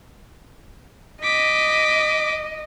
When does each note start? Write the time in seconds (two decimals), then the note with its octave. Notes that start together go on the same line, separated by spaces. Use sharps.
1.23 D#5 D6 B6